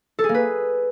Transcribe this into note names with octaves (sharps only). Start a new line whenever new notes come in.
A4
G#4
A#3
B4